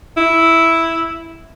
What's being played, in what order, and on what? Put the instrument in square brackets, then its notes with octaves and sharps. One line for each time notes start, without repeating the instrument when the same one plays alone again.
[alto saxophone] E4